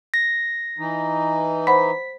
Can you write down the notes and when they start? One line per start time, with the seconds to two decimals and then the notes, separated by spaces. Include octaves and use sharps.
0.14 A#6
0.79 E3 D#4
1.67 C5 F#5 B5 B6